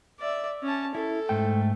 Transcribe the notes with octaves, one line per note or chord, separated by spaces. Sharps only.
D5 E5
C#4 A5
E4 A4
G#2 A3 G5